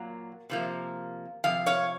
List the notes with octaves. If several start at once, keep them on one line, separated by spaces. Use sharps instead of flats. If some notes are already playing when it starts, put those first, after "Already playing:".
Already playing: A#2 F#3 A#3
C3 F3 A#3
C3 F3 F5
C#5 F5